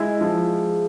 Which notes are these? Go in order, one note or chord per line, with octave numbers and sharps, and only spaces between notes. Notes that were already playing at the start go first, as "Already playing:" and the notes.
Already playing: G#3 E4
F3